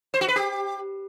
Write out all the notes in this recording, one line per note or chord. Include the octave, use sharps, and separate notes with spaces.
C5
F#4
B4
G4